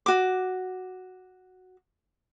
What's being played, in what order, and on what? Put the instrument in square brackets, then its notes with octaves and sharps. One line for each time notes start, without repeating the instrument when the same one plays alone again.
[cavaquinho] F#4 D6